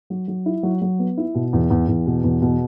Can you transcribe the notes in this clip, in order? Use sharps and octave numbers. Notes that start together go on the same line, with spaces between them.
F#3
F#3
E4
F#3
F#3
B3
E4
B2
E2
E2
E2
B2
E2
B2